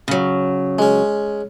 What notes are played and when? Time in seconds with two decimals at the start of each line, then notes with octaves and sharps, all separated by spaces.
0.08 C#3 F#3
0.79 G#3 C#4